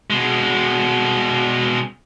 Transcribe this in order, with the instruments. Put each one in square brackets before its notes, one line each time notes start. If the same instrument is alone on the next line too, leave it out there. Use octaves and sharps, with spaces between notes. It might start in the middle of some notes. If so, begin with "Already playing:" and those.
[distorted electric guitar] B2 G#3